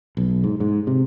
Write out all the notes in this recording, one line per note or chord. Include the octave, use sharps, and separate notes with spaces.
B1
G#2
G#2
C3